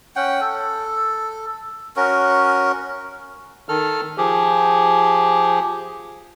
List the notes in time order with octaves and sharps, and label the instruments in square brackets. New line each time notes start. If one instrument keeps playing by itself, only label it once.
[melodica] C#4 F#5 G5
A4
C#4 F#4 A#4
[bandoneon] D#3 A4 F6
F3 G4 G#4